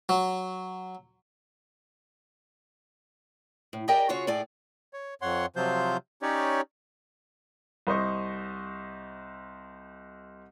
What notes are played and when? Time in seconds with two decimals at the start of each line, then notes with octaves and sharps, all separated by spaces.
0.09 F#3
3.73 A2
3.88 G4 G#4 A#4 D5 D#5 G5
4.09 C#3 F4 F#4 G#4 C#5
4.27 A2 A3 G#4 D5
4.93 C#5
5.22 F2 C#5 F#5 C6
5.56 C3 F3 F#3 F4 C5 G6
6.22 C#4 D#4 G4 C#5 D5
7.87 C2 C5 D#5 C#6